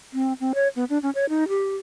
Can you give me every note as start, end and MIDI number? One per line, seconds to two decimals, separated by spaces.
0.14 0.33 60
0.40 0.52 60
0.55 0.68 73
0.76 0.84 59
0.90 0.98 62
1.03 1.10 61
1.15 1.25 73
1.29 1.48 63
1.48 1.76 67